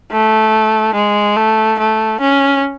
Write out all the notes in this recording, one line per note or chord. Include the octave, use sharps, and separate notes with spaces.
A3
G#3
A3
A3
C#4